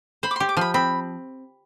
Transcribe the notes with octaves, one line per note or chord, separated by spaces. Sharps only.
C5 B5
D6
G4 C6
D6
F3 B5 C6
C4 B5